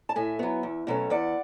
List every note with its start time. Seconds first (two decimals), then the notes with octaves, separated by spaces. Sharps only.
0.09 A5
0.16 A2 E5 G#5
0.39 F#3 B3
0.63 E2
0.87 B2 F#3 A3 C#4
1.10 E2 D5 F#5